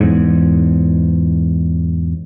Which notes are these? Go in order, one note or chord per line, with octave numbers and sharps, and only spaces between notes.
E2 G#2